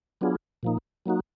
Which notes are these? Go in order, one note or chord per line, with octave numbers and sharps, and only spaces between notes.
F#3 B3 D4 F4 G#4
A#2 F3 A#3 D#4
F#3 A#3 D#4 F#4